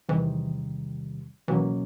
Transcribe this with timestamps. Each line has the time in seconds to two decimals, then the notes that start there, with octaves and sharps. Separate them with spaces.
0.09 E2 C3 D#3 E3 G3
1.48 C#2 B2 E3 F#3 A#3 C#4